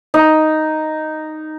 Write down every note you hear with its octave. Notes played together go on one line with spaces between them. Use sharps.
D#4